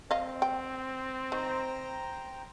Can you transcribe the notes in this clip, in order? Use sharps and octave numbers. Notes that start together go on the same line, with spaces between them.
C4 D#5 F5
G5
D#3 C5 G5 A#5